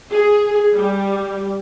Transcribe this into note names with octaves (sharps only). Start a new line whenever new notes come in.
G#4
G3